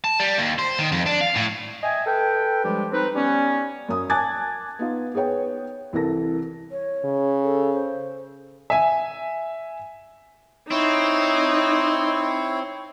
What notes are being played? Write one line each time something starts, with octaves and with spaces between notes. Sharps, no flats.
A5
G3
D#2
C5
D#3
F2
D4
F5
A2
D#5 E5 G5 G#5
A4 B4 G5
G2 F3 G3 G#3 G4
C4 D#4 B4
G3 B3 C#4
F#2 D#6
G#5 A5 D6 F#6 G#6 A6
B3 D#4 F4
B3 G#4 B4 C#5 G5
C2 E3 E4 A4 A#4 A#6
C#5
C#3
A4
C5
E5 G#5
C4 D#4 E4 C#5